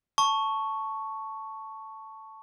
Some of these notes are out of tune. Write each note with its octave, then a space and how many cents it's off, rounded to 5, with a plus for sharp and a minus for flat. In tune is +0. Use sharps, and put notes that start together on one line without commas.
A5 +0 C#6 +0